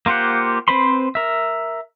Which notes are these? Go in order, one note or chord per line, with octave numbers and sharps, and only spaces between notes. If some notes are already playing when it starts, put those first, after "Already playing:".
A#3 F4 G4 C5 F#5
C4 B4 C5 B5 C6
A#4 E5